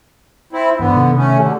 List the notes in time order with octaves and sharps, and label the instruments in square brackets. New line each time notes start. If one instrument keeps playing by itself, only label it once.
[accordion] C4 E4 [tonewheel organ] B5
[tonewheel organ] G2 E3 [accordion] D3 B3
[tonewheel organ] C3 D#3
[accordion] A3 C#4
[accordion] D3 [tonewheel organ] G4 A5